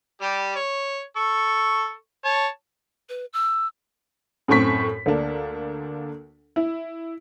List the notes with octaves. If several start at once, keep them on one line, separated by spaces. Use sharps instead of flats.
G3 G4
C#5
A4 C#6
C#5 A5
B4
E6
F#2 A2 A3 C4 C#6 B6
D2 D3 A#3 D4
E4